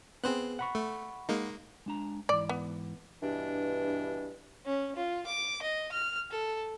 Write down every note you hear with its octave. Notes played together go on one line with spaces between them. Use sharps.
B3 C4 G#4 C5 F#6
F#5 B5 C#6
A3
G#3 A#3 D#4
G#3 D4 A#5
G#2 E3 D5
B3
G2 B2 E3 D4
C#4
F4
D6
D#5
F6
A4